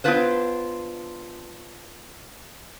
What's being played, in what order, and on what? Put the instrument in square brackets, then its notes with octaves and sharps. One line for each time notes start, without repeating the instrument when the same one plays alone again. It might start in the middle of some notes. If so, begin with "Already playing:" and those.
[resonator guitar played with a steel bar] B3 D4 E4 F4 B4 C5